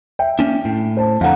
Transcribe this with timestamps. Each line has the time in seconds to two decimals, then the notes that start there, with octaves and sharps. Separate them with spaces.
0.19 E5 G5
0.39 A#3 C#4 D4
0.65 A2
0.97 C5 A5
1.21 F2 D3 F5 F#5 A#5